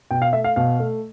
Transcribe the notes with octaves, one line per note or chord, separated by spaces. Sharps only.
B2 G5
F5
A3 E5
F5
B2 F5
A3